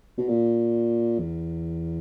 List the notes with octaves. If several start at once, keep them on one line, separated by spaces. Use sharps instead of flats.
B2
A#2
E2